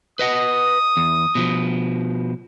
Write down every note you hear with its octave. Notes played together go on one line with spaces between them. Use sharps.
B4 D#5 F#5 D#6
E2
B2 F3